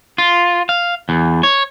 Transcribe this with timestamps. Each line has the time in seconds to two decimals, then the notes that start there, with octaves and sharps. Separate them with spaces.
0.18 F4
0.69 F5
1.09 E2
1.43 C#5